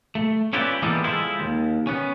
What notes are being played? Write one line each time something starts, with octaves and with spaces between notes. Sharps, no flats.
A3
C#4 E4 F4 G4 B4 D5
E3 G3 G#3 A#3 B3 A4
G#3 E4 F4 A4 C5
D#2
B3 C#4